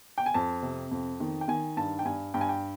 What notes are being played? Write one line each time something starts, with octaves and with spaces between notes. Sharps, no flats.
G5
G#5
F2 A5
C3
F2
D#3
G5
D#3 G#5
G2 A5
G5
G2 G#5
G2 G5
G#5
G5